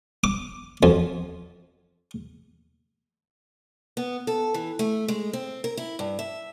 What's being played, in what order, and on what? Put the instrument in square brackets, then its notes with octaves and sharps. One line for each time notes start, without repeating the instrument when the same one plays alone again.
[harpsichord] D6
F2
[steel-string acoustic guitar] B3
A4
E3
A3
G#3
C4
A#4
E4
G2
E5